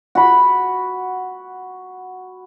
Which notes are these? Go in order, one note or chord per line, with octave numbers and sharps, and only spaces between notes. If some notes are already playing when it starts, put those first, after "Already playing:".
F#4 B5